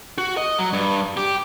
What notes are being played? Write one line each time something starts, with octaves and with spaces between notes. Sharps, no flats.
F#4
D#5
F#3
G2
G4